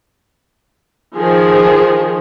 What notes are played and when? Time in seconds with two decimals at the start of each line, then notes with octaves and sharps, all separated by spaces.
1.17 D#3 F3 G#4